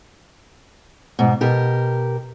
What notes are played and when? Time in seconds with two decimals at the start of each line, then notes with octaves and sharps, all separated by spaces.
1.19 G#2 B2
1.41 B2 G4 A#4